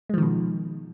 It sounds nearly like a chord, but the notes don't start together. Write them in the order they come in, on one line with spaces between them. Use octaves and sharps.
G#3 F3 D#3 B2